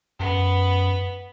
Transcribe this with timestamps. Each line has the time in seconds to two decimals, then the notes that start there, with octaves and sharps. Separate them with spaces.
0.19 F#2 B3